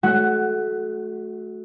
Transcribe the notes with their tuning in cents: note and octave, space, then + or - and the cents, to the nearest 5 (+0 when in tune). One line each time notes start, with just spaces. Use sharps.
A3 -25 F#4 +0 F#5 +15